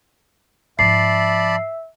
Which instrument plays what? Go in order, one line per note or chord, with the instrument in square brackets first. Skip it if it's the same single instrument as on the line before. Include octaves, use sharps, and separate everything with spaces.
[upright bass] G#2 F3 [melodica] D5 A5 B5 [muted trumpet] E5 [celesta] C7